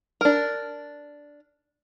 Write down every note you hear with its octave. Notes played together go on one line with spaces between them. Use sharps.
D4 A#4